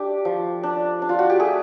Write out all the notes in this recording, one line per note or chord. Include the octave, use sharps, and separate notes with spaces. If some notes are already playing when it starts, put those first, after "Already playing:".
Already playing: A3 D4 G4
F3
D4
D4
F4
F#4
G4
A3 G#4